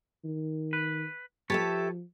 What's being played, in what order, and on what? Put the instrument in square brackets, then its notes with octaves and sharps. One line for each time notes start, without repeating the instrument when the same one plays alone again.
[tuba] D#3
[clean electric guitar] B4
[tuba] F3 [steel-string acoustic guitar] G4 A4 E5 [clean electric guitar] B4 C#5 A5